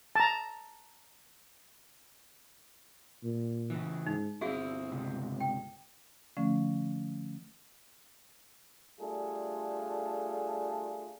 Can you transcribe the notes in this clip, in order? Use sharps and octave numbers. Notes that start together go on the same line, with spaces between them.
A5 A#5
A#2
C#3 E3
G#2 D#4
G1 C4 E4 F#4 G#4 F5
C#2 C3
G5
D3 F3 A3 C#4
G3 A3 D4 F4 G#4 A4